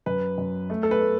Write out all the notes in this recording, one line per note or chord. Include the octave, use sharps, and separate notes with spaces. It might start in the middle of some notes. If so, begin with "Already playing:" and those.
F#2 B4
F#2
A3
A4
B4
A3